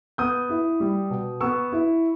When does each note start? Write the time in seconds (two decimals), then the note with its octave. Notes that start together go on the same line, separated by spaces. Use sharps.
0.18 B3 D#6 G6
0.49 E4
0.80 G3
1.10 B2
1.41 B3 C#6 E6
1.72 E4